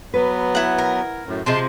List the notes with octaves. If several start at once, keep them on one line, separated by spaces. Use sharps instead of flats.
F#3 B3 B4
E4 F#5
A#4
F#2 A2
C3 F3 G#3 A5 C6